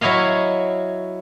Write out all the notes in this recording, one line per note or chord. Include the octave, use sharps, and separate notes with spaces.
F#3 E4 C#5 D#5 F5